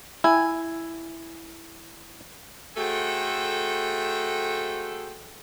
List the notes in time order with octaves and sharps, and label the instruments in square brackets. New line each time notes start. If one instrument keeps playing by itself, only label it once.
[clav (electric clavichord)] E4 [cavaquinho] G#5
[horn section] A3 F#4 G#4 A4 C5 G5